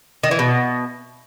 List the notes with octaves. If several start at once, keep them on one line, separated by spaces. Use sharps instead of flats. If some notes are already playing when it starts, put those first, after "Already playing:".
D#3
E3
B2